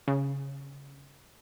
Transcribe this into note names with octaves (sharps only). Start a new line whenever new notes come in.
C#3